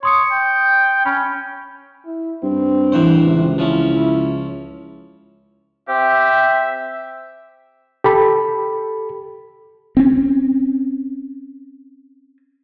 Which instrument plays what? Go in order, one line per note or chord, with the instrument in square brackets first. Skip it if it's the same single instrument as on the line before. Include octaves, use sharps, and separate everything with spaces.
[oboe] C#5 [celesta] C6 D#6 C#7
[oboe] G5
[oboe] C#4 [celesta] B5
[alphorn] E4
[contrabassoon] G2 [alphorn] C4
[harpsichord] A1 E3 C5
[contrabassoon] C#2 [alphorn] C3
[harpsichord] F3 C#4 [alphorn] E4
[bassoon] C4 [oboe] G4 [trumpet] E5
[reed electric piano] G4 A4 B5
[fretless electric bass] C4 C#4